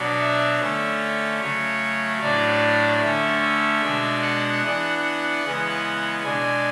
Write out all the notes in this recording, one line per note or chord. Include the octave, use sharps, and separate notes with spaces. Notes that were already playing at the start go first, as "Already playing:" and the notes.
Already playing: B2 F#3 B3 D4
E5
D3 A3 C#4
C#3 F#3 A3 C#5
A2 F#3 A3 D4 D5
D3 A3 C#4 E5
E5
B2 G#3 D4
F#5
E3 B3 D4
F#5
C#3 E3 G#3 B3
B2 G#3 D4 G#5